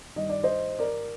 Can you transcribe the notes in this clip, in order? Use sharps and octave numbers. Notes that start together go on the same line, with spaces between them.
G2 D#3 G3 D#5
D5
C5 D#5
A#4 D5